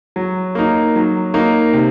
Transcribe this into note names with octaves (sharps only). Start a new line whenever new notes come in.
F#3
A#3 D#4
F#3
A#3 D#4
C3